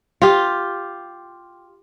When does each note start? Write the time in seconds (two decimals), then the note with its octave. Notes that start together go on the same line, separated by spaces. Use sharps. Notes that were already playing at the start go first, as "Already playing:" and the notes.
0.22 F4 G4